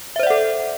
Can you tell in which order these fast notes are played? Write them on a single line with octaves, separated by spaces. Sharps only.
E5 C5 D5 F#5 A4